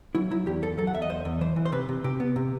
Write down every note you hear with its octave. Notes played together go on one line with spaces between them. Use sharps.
F#3 E4
F#3 E4
E2 G4
E2 A4
F#3 A4
F#5
E2 E5
D#5
E2 C5
E2
E3 C5
E3
C5
C3 B4
C3
C3 G4
B3
C3